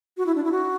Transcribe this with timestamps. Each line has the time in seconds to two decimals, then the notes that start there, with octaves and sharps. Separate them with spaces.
0.17 F#4
0.26 E4
0.35 D4
0.44 E4
0.52 F#4